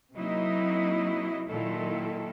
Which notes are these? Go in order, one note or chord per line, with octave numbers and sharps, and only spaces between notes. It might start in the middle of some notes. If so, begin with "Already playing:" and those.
C3 F#3 A#3 D#4 E4 D#5
A#2 D#3 F#3 E4 A4